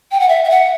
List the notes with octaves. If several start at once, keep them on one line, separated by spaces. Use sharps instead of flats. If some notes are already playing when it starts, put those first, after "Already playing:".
G5
F#5
E5
E5
F#5